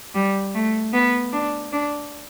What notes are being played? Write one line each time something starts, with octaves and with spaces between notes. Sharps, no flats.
G3
A3
B3
D4
D4